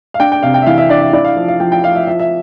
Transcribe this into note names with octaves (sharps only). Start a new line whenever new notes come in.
F5
D4 G5
G5
C3 F5
G5
E5
E3 F5
E5
D4 D5
E5
E4 D5
F5
F3
F5
F3 G5
G5
F3 F5
E5
F3 E5
E5